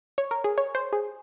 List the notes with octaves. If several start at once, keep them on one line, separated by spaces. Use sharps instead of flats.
C#5
A#4
G#4
C#5
C5
G#4